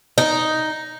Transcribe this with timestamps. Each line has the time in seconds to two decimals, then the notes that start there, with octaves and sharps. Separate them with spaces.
0.18 D#4